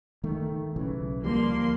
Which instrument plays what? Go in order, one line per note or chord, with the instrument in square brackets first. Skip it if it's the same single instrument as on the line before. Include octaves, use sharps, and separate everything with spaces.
[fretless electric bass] D#3 A3
B1 C#3 E3
[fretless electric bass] D2 F3 G3 [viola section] A#3 C6